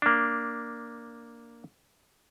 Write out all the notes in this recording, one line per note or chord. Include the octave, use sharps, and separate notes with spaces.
A#3 D4